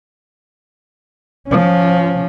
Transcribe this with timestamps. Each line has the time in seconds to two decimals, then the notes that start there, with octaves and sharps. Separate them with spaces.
1.48 F3 C#4